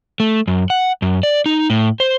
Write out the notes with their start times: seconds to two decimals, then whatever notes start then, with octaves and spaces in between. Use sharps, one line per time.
0.20 A3
0.48 F#2
0.70 F#5
1.02 F#2
1.23 D5
1.46 D#4
1.70 A2
2.00 C5